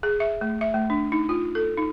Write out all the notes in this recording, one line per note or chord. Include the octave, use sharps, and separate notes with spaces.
G#4
E5
A3
E5
A3
D4
D#4
F4
A4
D#4